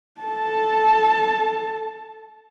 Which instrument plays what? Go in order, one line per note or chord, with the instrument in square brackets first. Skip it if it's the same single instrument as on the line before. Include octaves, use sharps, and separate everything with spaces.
[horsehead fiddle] A4 A5